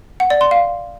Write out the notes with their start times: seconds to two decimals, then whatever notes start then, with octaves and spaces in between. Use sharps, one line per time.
0.20 F#5
0.30 D5
0.41 C6
0.51 F5